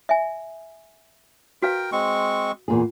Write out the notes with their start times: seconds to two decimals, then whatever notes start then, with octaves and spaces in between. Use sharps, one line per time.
0.09 E5 G#5
1.62 F#4 A#4 B4 F5 G5
1.92 G#3 C4 C#6
2.68 E2 A#2 G#4